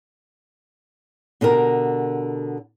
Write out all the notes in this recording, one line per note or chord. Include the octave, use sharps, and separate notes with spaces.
B2 D3 G4 A#4